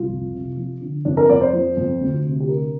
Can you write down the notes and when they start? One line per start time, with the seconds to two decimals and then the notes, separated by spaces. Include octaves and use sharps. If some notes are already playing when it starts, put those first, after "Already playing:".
Already playing: C2 F4
0.09 F2
0.34 C3
0.57 F3
0.81 D3
1.05 F2 D4
1.17 A#4
1.29 F2 D5
1.41 C5
1.53 F3
1.77 F2
2.01 D2
2.25 C3
2.40 G4
2.49 D3 A#4